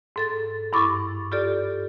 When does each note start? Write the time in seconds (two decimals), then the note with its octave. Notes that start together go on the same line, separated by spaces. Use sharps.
0.16 G#2 A4 A6
0.73 G2 E4 B5 C#6 D6 A6
1.32 F4 G4 A4 D5